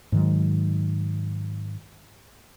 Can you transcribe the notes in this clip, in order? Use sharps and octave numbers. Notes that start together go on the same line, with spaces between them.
G#2 D#3 F#3